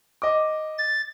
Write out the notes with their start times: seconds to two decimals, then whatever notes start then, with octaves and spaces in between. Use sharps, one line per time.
0.22 D#5 D6
0.78 A6